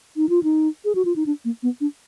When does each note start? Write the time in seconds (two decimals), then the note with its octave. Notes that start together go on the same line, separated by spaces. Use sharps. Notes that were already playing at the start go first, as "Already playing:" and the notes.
0.17 D#4
0.29 F4
0.43 D#4
0.85 G#4
0.95 F#4
1.05 F4
1.16 D#4
1.26 D4
1.45 A#3
1.63 B3
1.81 D4